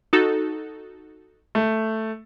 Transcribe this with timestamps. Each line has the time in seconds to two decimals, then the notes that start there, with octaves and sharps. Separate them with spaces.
0.13 D#4 F#4 A4
1.55 A3